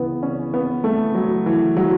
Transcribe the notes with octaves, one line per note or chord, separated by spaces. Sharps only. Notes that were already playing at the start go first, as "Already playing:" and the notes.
Already playing: C#2 C#3 E3 B3
C#4
B3
A3
F#3
E3
F#3